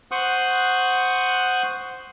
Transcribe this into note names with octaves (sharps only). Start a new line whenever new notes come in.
C5 F#5 C6 C#6 D#6 F#6